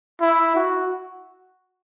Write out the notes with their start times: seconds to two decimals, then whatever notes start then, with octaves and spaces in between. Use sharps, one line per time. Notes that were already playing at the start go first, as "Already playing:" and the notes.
0.21 E4
0.55 F#4